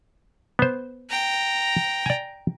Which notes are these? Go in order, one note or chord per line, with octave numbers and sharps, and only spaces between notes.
B3 C5
G5 A#5
D5 G#5